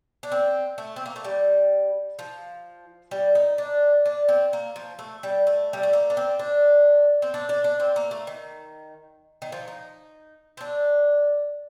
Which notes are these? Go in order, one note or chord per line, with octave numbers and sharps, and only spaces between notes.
D4
C4
A3
C4
A#3
A3
G3
F3
G3
D#4
D4
D4
C4
A#3
F3
A3
G3
A3
G3
A3
A#3
D4
C4
D4
C4
D4
D4
D4
C4
A#3
A3
D#3
D#3
F3
D#4
C4
D4